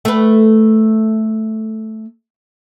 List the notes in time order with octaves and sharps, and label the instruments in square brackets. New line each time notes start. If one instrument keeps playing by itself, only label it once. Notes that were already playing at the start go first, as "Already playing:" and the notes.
[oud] A3 B4